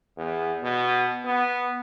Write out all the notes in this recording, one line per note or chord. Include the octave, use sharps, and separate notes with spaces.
E2
B2
B3